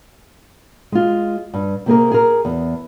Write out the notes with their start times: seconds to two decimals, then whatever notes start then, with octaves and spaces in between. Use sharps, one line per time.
0.92 G#3 F4
1.54 G2
1.86 C3 A#3 G#4 A#4
2.11 G#4 A#4
2.45 E2